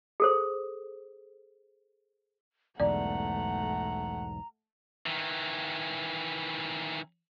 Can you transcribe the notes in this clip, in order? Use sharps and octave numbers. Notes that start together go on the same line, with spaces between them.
G#4 A4 C5
B1 E2 G#2 A3 D5 F#5 A#5
D#3 E3